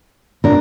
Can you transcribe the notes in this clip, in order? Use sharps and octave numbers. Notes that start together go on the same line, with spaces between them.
D4 A#4